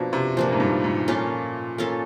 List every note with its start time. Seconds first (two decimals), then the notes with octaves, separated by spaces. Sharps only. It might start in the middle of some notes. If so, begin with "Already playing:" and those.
Already playing: B2 F3 A#3 D4
0.13 C3
0.36 A#2 F3 A#3 D4
0.52 G#2
0.60 G2
0.84 G#2
1.08 A#2 A#3 C#4 F4 A4
1.78 A#3 C#4 F4 A4